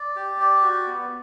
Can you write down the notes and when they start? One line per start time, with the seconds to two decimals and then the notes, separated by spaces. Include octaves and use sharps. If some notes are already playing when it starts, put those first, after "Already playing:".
Already playing: D5
0.16 G4
0.40 D5
0.62 F#4
0.87 B3